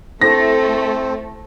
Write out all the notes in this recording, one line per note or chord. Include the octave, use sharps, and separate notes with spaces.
A3 C4 D#4 E4 A4 A#6